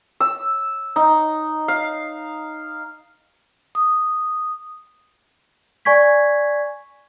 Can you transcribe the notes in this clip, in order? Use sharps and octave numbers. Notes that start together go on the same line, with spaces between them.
E6
D#4
F5
D#6
D5 G#5 C#6 G#6 B6